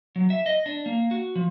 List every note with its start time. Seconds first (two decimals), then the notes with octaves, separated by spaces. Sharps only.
0.16 F#3
0.30 E5
0.46 D#5
0.66 D4
0.86 A#3
1.11 F#4
1.35 F3